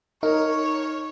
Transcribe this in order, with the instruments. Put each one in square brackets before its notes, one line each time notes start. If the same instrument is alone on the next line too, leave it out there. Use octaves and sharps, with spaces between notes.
[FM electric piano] D#4 [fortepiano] A#4 [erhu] C#5